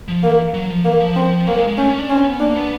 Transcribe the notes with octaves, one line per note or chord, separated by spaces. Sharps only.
F3
E3 A#3
F#3
F3
E3 A#3
F3
C4
F#3 A#3
G#3
G#3
A3 C#4
C#4
D4
C4 C#4
B3
A#3 D4
B3